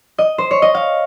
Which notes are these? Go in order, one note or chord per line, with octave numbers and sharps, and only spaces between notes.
D#5
C5
C#5
D#5
F5